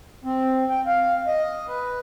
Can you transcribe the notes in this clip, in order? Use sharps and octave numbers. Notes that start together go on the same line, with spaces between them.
C4
G5
F5
D#5
B4